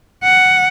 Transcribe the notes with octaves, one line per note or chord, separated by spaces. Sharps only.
F#5